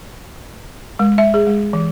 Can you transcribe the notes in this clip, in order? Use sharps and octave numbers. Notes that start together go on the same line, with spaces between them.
G#3
E5
G#4
G#3
E3